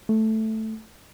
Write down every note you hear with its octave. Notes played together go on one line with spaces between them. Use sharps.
A3